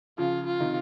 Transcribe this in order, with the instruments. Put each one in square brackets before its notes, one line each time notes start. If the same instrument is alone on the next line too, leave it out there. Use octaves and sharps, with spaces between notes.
[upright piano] C#3 F3 [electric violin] F4
[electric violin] F4
[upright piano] C3 D#3